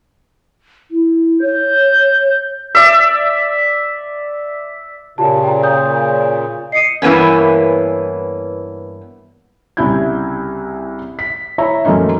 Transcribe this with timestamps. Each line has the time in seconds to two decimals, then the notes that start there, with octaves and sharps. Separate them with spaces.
0.91 E4
1.42 C#5 G6
2.75 D5 E5
5.18 A#2 C#3 F4 G4 A5
5.44 G5 A#5
5.63 D#6 G6
6.72 D#5 C7 C#7 D#7
7.02 G2 E3 A#3 B3 C#4
9.77 C2 C#3 C#4 E4 G6 G#6
11.19 B6
11.58 E4 C#5 E5 A#5
11.85 F#2 F3 A3 A#3 C#4 D#4